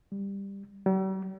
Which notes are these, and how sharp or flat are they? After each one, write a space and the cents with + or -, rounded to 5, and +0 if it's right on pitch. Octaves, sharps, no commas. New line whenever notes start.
G3 +15
G3 -45